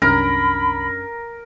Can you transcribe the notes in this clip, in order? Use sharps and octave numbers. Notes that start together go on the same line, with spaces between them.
C2 F#2 C#4 D4 A#4 B5